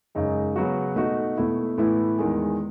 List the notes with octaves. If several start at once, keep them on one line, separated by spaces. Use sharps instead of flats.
F#2 C#3 G#3 D#4
C#3 F#3 B3 F#4
B2 A3 D#4 F#4
B2 A3 E4
A2 E3 B3 E4
E2 D#3 G#3